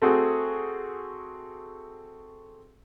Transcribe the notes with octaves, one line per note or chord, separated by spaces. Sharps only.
A3 C4 F#4 G#4